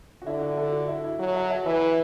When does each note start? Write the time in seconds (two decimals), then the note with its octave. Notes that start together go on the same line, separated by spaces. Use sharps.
0.22 F#4
0.26 D3 E4
0.41 F#4
0.57 E4 A4
0.72 F#4
0.88 E4
1.04 E4
1.19 F#3 F#4
1.35 E5 A5
1.50 E5 A5
1.66 E3 B4 E5